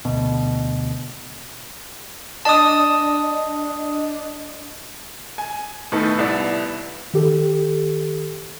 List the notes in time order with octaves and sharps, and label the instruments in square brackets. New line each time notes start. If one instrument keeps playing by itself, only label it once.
[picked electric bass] D2 B2
[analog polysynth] D4 D#5 [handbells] A5 D#6
[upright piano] G#5
A2 D#3 A3 B3 D#4 A4
C2 B3 E4 D5
[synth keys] D#3 G4 A4